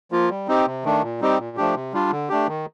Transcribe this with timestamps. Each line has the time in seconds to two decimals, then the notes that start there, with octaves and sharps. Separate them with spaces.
0.12 F3 A#3 F4
0.30 G3
0.48 C4 D#4 G4
0.66 C3
0.84 D#3 A3 D4
1.02 A#2
1.20 G3 C4 D#4 G4
1.38 A#2
1.57 F3 A3 D4 G4
1.75 C3
1.93 G3 D4 F4
2.11 D3
2.29 A3 D4 G4
2.48 D#3